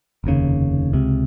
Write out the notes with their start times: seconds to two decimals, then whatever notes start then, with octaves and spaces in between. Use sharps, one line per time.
0.24 F1 D#2 C#3
0.93 C#2 C3